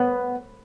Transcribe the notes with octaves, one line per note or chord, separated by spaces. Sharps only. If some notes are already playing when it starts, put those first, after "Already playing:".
Already playing: B3